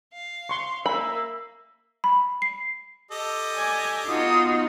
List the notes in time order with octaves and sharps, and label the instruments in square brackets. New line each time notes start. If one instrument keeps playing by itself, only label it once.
[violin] F5
[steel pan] C6 C#6
[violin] A#3 [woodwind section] E5 A#5 E6 [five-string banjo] B5
[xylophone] B5
C7
[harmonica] G4 A4 D#5
[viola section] D5 G#5
[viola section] B3 D#4 [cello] F4 F#4 [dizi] D#6